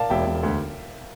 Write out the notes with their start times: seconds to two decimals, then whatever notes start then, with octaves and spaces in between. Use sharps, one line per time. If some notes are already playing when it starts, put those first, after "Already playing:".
Already playing: A#4 D5 F5 A5
0.10 E1 E5 G5
0.26 E1
0.43 D2